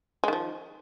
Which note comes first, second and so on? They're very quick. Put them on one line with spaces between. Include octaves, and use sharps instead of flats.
G#3 D#3 F3